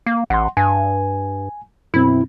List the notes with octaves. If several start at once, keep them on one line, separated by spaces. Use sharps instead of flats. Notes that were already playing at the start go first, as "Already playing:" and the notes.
A#3
A1 F#5 C6
G2 G#5
F#2 B2 C4 E4